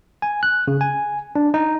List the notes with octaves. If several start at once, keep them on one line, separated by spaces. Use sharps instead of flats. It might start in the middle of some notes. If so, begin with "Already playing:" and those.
G#5
F#6
C#3
G#5
D4
D#4